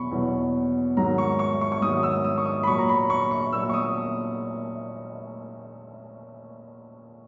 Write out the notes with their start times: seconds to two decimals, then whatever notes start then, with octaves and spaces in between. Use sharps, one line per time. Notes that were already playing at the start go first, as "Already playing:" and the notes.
Already playing: E2 B2 F#3 B5 C#6
0.11 E2 B2 F#3
0.97 G#2 D#3 F#3 A#5
1.18 C#6
1.39 C#6
1.61 C#6
1.72 C#6
1.82 G#2 D#3 F#3 D#6
2.03 E6
2.25 D#6
2.38 C#6
2.45 D#6
2.63 B5
2.67 A#2 F#3 C#6
2.79 A#5
2.89 B5
3.10 C#6
3.31 C#6
3.52 A#2 F#3 E6
3.69 C#6
3.74 D#6